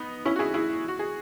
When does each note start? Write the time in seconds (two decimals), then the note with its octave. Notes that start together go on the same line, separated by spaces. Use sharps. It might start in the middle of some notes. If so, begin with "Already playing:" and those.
Already playing: B3 D#4
0.25 C#4 E4
0.36 F#4
0.39 E4 G#4
0.54 E4 G#4
0.88 F#4
0.99 G#4